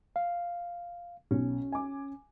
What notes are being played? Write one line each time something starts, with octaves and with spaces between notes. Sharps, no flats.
F5
B1 C#4
G#5 D6